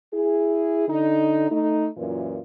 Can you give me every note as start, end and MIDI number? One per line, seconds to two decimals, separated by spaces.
0.13 0.87 64
0.13 0.87 68
0.88 1.49 50
0.88 1.49 63
1.51 1.87 57
1.51 1.87 63
1.97 2.39 42
1.97 2.39 46
1.97 2.39 52
1.97 2.39 65